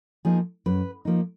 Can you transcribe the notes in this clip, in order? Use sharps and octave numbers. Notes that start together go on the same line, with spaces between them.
F3 A#3 D#4 G#4
F#2 B4
F3 A#3 D#4